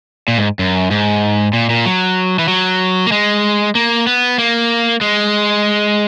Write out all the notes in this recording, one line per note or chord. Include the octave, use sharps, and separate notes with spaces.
A#2
G#2
F#2
G#2
A#2
A#2
F#3
E3
F#3
A#3
G#3
A#3
B3
A#3
G#3